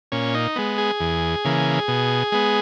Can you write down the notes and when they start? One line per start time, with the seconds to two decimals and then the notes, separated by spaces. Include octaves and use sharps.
0.12 A#2 C#4
0.34 D#4
0.56 G#3 B3
0.78 G#4
1.00 E2
1.45 C#3 E3 A#3
1.88 B2
2.32 G#3 B3